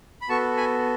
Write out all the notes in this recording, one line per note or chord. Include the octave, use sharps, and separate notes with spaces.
B5
B3 F#4 A4 A5 C#6
G#5 B5